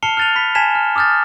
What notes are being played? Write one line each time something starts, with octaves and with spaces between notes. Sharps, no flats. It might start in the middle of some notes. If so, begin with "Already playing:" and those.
A5 F6 C7 C#7 F7 G7
F6 F#6 A6 D#7 F7
B5 B6
G#5 A5 G#6 B6 E7
F6
D6 D#6 F6 G6 A6